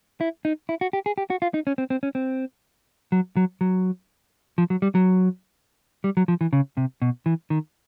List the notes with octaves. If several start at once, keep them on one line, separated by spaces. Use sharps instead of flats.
E4
D#4
E4
F#4
G4
G#4
G4
F#4
F4
D#4
C#4
C4
C4
C#4
C4
F#3
F#3
F#3
F3
F#3
G3
F#3
G3
F#3
F3
E3
C#3
C3
B2
E3
D#3